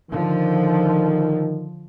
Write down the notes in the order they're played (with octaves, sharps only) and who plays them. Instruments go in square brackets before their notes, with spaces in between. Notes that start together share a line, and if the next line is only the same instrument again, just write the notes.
[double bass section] D3 F3 [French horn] D#3